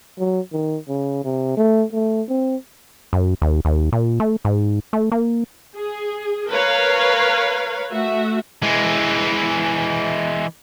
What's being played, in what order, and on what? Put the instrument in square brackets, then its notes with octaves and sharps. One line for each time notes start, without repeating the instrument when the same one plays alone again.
[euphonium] F#3
D#3
C#3
C3
A3
A3
C4
[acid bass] F#2
D#2
D#2
A#2
A3
G#2
A3
A#3
[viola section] G#4
A#4 B4 C#5 F5
A3 F#4 E5
[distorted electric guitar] E3 G#3